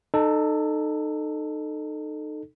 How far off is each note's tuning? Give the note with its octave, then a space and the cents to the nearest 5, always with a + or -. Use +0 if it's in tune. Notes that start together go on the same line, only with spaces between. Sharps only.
D#4 -25 A4 +0